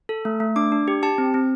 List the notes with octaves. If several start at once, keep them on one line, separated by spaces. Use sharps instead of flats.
A4
A3
A3
D4 D6
D4
G4
G4 A5
C4
C4